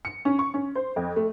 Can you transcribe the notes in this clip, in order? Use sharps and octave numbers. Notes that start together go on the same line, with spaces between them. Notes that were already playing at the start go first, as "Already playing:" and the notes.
C#7
C#4
C#6
C#4
C5
F2
A3